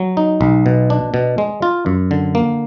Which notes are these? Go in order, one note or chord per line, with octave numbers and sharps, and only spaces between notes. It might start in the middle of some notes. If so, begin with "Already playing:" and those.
Already playing: F#3
D#4
B1
B2
D4
B2
G#3
F4
F#2
D3
A#3